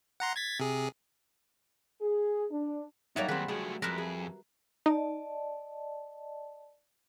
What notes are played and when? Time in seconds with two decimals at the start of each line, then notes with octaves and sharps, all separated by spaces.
0.20 F#5 A#5 C6
0.36 G#6 A6 B6
0.60 C3 G#4
2.01 G#4
2.50 D4
3.16 F#3 G3 A#3 D#4 C#5 E5
3.28 D#2 C4 F#4 G#4 B4
3.48 F3 A3 F#4 G#4
3.82 F2 G#3 A#4 B4 E5
3.98 G#4
4.86 D#4 D5 D#5 A5